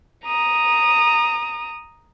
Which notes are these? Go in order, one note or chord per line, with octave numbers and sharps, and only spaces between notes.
A#5 D#6